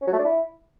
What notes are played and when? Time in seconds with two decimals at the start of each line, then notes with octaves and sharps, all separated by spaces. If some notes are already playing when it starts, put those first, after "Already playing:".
0.01 C#4
0.07 F#3
0.13 A3
0.19 D4
0.24 E4